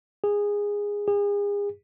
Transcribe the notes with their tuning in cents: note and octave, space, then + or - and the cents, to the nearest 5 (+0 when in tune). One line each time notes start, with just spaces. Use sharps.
G#4 -15
G#4 -35